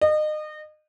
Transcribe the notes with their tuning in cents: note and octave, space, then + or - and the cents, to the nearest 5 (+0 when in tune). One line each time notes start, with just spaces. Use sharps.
D#5 -30